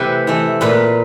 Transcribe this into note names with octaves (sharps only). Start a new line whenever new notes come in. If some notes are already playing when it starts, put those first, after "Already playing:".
Already playing: C3 E3 A3 B4
E3 A3
A#2 B4